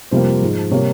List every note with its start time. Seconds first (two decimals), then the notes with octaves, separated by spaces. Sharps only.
0.11 F2 C3 G3 A#3 C5
0.41 G#2 F3 G#3
0.71 C3 G3 A#3 C#5